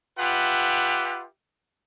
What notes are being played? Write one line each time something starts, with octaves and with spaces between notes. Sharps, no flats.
F4 G4 B4 E5 F#5